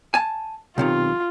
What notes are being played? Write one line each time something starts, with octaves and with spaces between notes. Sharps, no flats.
G#5 A5
B1 C3 D#3 F4